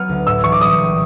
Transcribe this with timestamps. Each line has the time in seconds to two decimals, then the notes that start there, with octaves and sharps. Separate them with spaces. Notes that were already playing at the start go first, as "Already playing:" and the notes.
Already playing: F#3 B3 F6
0.09 D2
0.27 A2 E6
0.44 E3 C#6
0.52 D6
0.61 G3 D#6
0.79 A#1